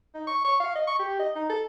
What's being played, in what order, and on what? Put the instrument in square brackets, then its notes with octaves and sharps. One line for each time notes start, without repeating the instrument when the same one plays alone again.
[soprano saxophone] D#4
C#6
C#6
F5
D#5
C#6
G4
D#5
D#4
A4